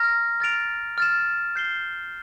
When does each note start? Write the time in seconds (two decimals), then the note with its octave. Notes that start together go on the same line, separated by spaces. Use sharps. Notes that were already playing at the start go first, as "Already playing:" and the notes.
Already playing: A#5 F6 A#6
0.40 F6 A6 D7 F7
0.98 F6 A6 E7
1.56 G6 C7 G7